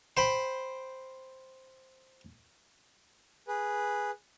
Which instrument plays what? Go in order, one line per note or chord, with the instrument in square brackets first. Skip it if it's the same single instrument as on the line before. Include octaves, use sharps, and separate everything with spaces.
[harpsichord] C5 G5 B5
[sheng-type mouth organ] G#4 B4